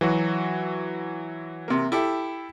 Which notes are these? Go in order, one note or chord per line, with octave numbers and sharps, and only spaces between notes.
E3 F#3 F#4
C3 A#3
E4 G4 A4